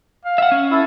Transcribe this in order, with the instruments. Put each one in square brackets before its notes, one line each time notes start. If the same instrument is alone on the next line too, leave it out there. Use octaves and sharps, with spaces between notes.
[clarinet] F5
[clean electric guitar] E5 F#5
C#4
[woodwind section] E4 A4